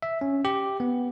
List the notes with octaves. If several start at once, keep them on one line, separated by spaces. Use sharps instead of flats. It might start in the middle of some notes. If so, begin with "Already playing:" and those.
E5
C#4
G4
B3